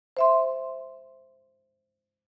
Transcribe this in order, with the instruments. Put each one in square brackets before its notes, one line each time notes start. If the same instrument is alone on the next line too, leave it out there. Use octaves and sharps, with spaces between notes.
[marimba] C5 E5 C6